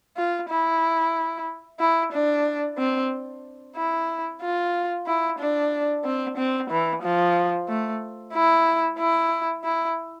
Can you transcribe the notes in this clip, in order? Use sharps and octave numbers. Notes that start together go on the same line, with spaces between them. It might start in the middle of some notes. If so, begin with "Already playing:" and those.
F4
E4
E4
D4
C4
E4
F4
E4
D4
C4
C4
E3
F3
A3
E4
E4
E4